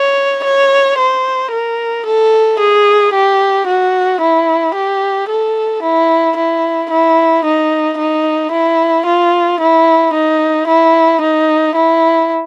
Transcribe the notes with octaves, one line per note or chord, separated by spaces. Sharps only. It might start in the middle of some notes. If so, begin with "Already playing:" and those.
Already playing: C#5
C#5
C5
A#4
A4
G#4
G4
F#4
E4
G4
A4
E4
E4
E4
D#4
D#4
E4
F4
E4
D#4
E4
D#4
E4